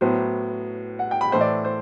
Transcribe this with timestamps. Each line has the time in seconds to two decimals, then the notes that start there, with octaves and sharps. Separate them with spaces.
0.01 A2 F#3 B3 C5
0.99 F#5
1.11 G5
1.21 B5
1.32 A2 E3 A3 C5
1.41 D5
1.65 C5